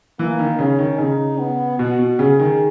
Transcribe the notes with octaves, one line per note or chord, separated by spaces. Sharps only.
E3 A#3
D#3
C#3 C#4
D#3
C#3 D#4
B3
B2 F#4
B2
C#3 G#4
D#3